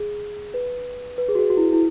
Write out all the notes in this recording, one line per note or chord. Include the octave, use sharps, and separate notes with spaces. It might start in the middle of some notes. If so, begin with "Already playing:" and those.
Already playing: G#4
B4
B4
G#4
F#4
G#4
F#4
E4
E4